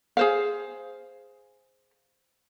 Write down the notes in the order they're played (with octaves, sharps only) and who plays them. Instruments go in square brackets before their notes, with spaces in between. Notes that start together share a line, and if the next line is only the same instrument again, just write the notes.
[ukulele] G#4 C5 F5